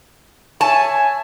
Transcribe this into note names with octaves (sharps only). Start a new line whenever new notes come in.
C#5 E5 G#5 A5